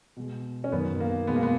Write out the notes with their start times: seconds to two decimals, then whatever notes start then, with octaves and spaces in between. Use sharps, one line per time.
0.16 B2 G#3
0.64 C#4
0.72 F#2 D#3 F#3 B3
1.00 A#3
1.27 B2 G#3 B3
1.36 A#3
1.43 B3